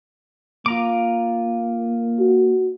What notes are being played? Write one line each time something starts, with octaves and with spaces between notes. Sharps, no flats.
A#3 F4 A#5 D6
F#4